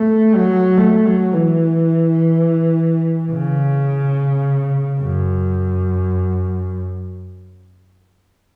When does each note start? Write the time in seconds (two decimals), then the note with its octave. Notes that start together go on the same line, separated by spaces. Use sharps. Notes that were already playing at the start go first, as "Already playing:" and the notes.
Already playing: A3
0.35 F#3
0.77 A3
1.05 F#3
1.33 E3
3.31 C#3
5.00 F#2